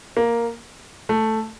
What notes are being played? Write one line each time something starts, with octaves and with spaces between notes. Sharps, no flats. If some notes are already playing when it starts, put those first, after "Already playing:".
A#3
A3